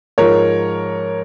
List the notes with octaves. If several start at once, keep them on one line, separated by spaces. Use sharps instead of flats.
G#2 F3 A#4 C#5